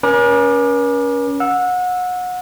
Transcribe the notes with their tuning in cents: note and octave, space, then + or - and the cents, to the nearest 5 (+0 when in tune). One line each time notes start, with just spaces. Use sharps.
C#4 +15 A#4 +45 D6 +20
F#5 -30 E6 +0